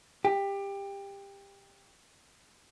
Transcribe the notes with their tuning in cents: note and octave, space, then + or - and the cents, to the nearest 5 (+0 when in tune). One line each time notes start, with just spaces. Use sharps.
G4 +20